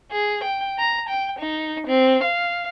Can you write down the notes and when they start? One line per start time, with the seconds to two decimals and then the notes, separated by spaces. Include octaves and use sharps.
0.11 G#4
0.44 G5
0.79 A#5
1.09 G5
1.39 D#4
1.87 C4
2.23 F5